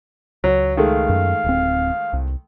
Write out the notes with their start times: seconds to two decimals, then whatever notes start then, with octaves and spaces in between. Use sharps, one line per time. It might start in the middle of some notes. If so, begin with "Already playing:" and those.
0.44 C#2 F#3
0.77 D#3 G#3 A3 F5
1.09 F#2
1.44 D1 C4
2.13 C2